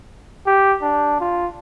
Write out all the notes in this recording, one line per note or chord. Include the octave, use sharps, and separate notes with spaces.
G4
D4
F4